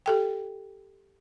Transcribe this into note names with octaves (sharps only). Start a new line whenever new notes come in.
G4 A4 G5